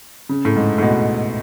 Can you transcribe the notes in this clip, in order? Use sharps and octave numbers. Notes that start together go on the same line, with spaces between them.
C#3
A2
G#2
A2
B2